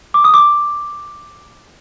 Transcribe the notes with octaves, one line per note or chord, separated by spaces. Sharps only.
D6
D#6
D6